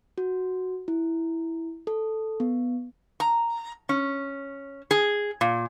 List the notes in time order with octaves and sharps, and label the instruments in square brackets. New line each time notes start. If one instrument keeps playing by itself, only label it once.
[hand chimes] F#4
E4
A4
B3
[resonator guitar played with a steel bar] A#5
C#4
G#4
A#2